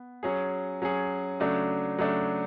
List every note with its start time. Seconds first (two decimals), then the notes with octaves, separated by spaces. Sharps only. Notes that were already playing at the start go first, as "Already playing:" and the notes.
Already playing: B3
0.23 F#3 C#4 G#4
0.82 F#3 C#4 G#4
1.40 C#3 F#3 A3 D4
1.99 C#3 F#3 A3 D4